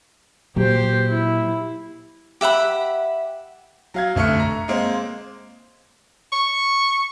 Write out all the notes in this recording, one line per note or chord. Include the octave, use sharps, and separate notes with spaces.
A#2 F#3 G4 C5
E4
G4 E5 F#5 B5
F#3 F5 G#6
F1 D3 A3 C#6 F6 C#7
A#5
G#3 A#3 C4
C#6